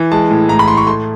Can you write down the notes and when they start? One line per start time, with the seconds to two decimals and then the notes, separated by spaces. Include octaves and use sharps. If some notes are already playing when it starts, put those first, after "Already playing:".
Already playing: E3
0.11 G#3 A5
0.31 A2
0.49 A2 A#5
0.59 B5
0.68 A2 C6
0.77 C#6
0.87 A3 C6